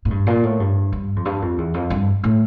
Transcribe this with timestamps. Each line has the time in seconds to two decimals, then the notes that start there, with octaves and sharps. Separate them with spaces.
0.05 A2
0.10 G2
0.27 A#2
0.43 A2
0.60 G2
0.92 G2
1.16 F2
1.25 G2
1.42 F2
1.58 E2
1.74 F2
1.90 G2
2.24 A2